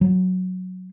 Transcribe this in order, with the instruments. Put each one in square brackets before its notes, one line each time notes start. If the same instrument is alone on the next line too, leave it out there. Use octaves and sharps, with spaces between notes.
[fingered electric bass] F#3